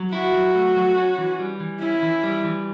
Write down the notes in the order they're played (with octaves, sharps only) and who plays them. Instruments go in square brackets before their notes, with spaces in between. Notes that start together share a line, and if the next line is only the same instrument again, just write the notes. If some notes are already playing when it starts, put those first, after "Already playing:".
Already playing: [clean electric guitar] F#3
[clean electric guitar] E4 [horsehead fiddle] F#4
[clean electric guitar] F#3
A3
F#3
C#4
E3
G3
E3
[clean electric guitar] C#4 [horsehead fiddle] E4
[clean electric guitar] E3
G3
E3